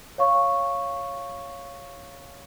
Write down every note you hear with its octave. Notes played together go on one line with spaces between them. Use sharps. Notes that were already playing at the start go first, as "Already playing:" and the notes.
C#5 F5 C#6